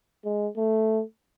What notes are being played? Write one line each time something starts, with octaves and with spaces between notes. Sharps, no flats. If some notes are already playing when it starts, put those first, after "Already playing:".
G#3
A3